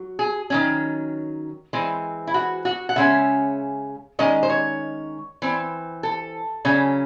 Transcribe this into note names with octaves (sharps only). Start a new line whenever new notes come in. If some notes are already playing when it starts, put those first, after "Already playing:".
Already playing: F#3
G#4
D#3 F#3 C#4
E3 G#3 C4
E4
F#4
F#4
F#5
C#3 G#3 C#4 E5
D#3 G#3 C#4 D#5
C5
C#5
E3 C4
A4
C#3 F#3 C#4